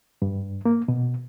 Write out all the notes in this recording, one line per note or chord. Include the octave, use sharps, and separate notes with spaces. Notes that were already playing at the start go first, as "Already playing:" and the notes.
G2
A#3
B2